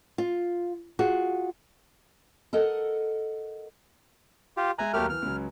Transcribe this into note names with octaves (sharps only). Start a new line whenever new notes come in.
F4
F4 F#4 G#4
A4 A#4 D#5 F#5
F4 G4
G#3 E5 G#5 A#5 F#6
D#2 F#3 A3 G4 A#4 F6
E3 F6
C#2 C#3 F#3